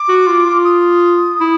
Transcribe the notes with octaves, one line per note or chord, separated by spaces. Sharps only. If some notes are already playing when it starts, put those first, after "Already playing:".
Already playing: D6
F#4
F4
F4
D#6
E4